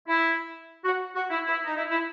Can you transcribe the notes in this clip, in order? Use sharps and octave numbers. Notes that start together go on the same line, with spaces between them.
E4
F#4
F#4
E4
E4
D#4
E4
E4